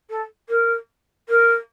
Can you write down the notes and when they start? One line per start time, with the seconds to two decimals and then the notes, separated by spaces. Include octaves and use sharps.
0.09 A4
0.49 A#4
1.29 A#4